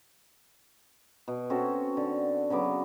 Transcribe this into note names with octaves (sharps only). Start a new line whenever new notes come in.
B2
C4 C#4 F#4 A4
D3
C#3 F#3 B3 D6